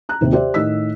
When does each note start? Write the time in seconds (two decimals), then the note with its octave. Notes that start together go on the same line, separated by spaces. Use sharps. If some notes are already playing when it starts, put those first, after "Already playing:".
0.09 A#5 F#6
0.21 D#2 C3 D#3
0.33 G4 C5 D5 E5
0.54 A2 D#3 D#5 E6 B6